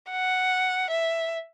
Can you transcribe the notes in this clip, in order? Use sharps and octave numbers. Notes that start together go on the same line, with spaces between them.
F#5
E5